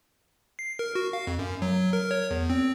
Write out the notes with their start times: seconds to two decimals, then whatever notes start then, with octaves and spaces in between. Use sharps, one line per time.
0.59 C7
0.79 A#4
0.95 F#4
1.13 F5
1.27 F2
1.39 F#2
1.62 F#3
1.93 A#4
2.11 C#5
2.31 E2
2.50 C4